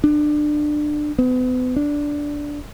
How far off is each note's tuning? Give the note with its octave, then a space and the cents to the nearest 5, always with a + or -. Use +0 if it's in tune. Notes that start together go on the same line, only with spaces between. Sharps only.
D4 +25
B3 +40
D4 -5